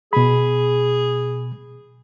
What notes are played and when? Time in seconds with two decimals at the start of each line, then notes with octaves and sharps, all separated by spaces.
0.13 B2 G#4 B5